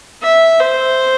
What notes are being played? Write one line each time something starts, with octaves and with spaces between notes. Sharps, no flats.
E5
C5